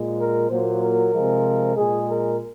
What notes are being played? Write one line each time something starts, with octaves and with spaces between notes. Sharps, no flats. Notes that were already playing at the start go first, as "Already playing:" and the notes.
Already playing: A#2 G#3
A#4
A#2 F#3 A#3 C5
A#4
C3 F3 G#3
A#2 G#3 G#4
A#4